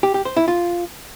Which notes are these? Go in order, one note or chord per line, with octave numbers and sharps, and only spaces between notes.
G4
G4
C5
E4
F4